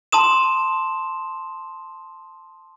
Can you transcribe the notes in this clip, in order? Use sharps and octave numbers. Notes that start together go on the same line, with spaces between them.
A5 C6 D#6 E7